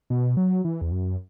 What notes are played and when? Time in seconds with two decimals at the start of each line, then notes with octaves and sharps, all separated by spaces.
0.10 B2
0.37 F#3
0.65 E3
0.81 E2
0.91 F#2